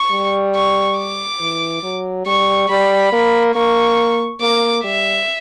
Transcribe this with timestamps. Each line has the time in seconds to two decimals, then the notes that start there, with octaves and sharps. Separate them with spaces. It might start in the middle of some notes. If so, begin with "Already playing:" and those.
Already playing: C#6
0.11 G3
0.55 C#6
0.98 D6
1.40 E3
1.83 F#3
2.26 G3 C#6
2.69 G3 B5
3.12 A#3 B5
3.55 A#3 C#6
4.41 A#3 D6
4.84 G3 E5